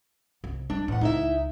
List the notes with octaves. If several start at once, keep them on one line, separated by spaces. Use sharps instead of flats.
C2
G3 D4
E2 A2 F#5
C#2 D#4 E4 E5